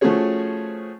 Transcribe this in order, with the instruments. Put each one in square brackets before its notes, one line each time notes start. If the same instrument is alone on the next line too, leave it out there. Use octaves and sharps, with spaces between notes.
[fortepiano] F3 A3 C#4 F#4 G#4 C#5